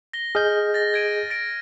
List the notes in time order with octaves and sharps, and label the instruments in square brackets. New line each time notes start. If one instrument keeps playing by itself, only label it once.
[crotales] A#6 G7
[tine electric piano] G#4 D#5 G6 [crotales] F6
[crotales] A6 A#6
G#6 D7 D#7
A6 A#6 D7